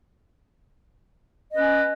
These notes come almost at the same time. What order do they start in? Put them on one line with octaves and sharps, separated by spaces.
D#5 B4 C#4